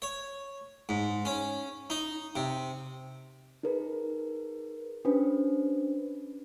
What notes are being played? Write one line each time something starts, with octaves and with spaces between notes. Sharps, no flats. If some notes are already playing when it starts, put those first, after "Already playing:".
C#5
G#2
C#4
D#4
C3
D#4 G#4 A#4 B4
C#4 D4 G4 B4 C5